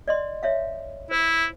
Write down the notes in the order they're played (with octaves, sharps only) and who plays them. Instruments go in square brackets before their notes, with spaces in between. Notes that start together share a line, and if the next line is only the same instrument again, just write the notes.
[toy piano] D5 D#5 C6
C#5 E5 F5
[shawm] E4 [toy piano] C5